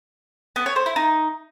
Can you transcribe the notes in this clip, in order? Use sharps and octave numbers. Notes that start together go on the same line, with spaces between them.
B3
C#5
C5
E4
D#4